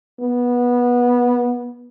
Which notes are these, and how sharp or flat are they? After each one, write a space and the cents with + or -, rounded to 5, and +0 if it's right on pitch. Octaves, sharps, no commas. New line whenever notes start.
B3 -20